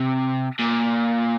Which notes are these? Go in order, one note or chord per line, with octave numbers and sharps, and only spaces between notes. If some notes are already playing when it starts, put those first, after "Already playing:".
Already playing: C3
A#2